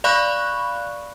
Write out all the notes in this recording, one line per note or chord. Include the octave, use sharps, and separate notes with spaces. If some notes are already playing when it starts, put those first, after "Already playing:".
D5 F5 B5 C#6 F#6